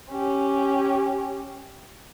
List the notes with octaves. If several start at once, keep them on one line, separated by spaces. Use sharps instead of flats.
C#4 G4